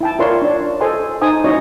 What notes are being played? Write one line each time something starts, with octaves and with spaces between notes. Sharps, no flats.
E4 G5 A5
E4 F4 A#4 C#5 D5 C6
D4 C#5
A4 C5 D#5 G#5 C6
D#4 C5 G#5 A5 D#6
C#4 E4 F#4 C#5 D#5